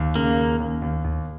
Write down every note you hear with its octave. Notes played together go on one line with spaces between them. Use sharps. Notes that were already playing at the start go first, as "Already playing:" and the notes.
Already playing: D#2
C#3 A#3
D#2
D#2
D#2
D#2